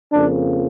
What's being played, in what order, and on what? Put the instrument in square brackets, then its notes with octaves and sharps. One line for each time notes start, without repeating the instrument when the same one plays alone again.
[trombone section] F2 C#3 F3 A#3 D4